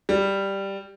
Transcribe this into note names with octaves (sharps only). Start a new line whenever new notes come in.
G3